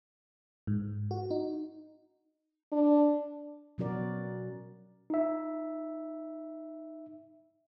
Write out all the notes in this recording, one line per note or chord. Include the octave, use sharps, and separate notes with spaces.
G#2
F#4
D#4
D4
B2 F#3 C#4 F#4 A#4 D5
D#4 E5